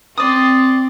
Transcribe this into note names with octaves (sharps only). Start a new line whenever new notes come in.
C4 D5 D#6